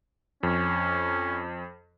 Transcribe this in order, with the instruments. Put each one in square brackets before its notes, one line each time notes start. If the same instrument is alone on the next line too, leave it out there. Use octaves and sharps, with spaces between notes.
[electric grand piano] F2 [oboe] C#4